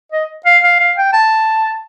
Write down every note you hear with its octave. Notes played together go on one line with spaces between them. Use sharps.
D#5
F5
F5
F5
G5
A5